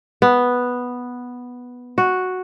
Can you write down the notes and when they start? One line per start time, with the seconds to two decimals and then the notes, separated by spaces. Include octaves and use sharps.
0.22 B3
1.98 F#4